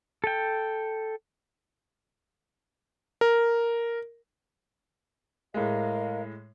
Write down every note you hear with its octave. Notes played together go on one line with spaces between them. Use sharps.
A4 G5
A#4
A2 G#3 A#4 D#5 F5